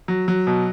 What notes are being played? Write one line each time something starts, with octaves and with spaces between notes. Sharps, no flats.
F#3
F#3
B2